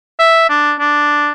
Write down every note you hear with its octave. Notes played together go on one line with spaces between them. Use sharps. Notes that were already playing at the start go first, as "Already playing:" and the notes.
E5
D4
D4